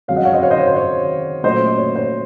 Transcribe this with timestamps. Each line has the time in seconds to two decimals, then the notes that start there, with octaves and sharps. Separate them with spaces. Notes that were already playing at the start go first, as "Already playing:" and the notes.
0.08 F2 C#3 F#3 C#5 F5
0.16 D#5 F#5
0.25 C#5 F5
0.33 C5 D#5
0.43 C#5 F5
0.50 C5 D#5
0.59 C#5
0.67 C5
0.76 C#5
1.44 A#2 F#3 A3 C#4 C5 D#5
1.78 C#5
1.96 C5